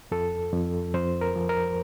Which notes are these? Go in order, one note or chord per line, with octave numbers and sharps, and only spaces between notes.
F2 A4
F2
F2 C5
A#4
F3
A#4